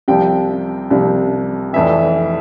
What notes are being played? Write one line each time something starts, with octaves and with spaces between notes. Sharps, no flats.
C2 C3 F3 G5
C2 C3 F3
F1 F2 E3 E5